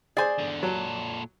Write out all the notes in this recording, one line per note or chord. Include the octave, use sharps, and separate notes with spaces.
G#4 C5 D5 G#5
E2 D3
A#2 F#3 A4